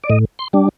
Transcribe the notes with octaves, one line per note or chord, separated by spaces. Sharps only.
D5
A2 D#5
C6
G3 D4